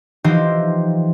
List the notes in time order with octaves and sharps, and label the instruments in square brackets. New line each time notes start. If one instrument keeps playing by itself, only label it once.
[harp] E3 F3 D#4 G4 C5